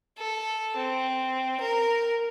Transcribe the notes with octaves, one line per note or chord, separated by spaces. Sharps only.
A4
C4
A#4